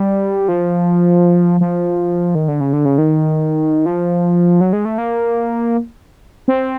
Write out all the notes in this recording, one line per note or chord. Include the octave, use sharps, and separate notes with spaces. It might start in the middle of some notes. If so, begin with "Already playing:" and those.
Already playing: G3
F3
F3
D#3
D3
C#3
D3
C#3
D#3
F3
F#3
G#3
A3
A#3
C4